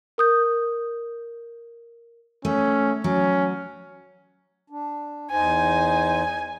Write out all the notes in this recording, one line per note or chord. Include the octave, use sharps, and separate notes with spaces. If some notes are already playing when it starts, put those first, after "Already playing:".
A#4 D#6 G6
A3 C#4
F#3 C#4
D4
E2 D#4 C5 G#5